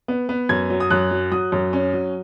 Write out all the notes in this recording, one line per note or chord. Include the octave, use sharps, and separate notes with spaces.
B3
B3
F#2 G#6
F#3
D#6
F#2 F#6
F#3
F#3 D#6
F#2
C#4
F#3